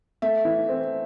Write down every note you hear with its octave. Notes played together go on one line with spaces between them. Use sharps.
A3 E5
E3
C4